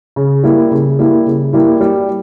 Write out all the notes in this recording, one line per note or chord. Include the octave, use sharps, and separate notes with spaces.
C#3
G3 A#3 E4
C#3
G3 A#3 E4
C#3
G3 A#3 E4
G3